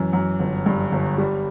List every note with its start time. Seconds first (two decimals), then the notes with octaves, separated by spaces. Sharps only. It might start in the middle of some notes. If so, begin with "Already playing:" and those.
Already playing: F#2 E3
0.13 F#2
0.39 G1
0.66 G2
0.92 G1
1.18 G3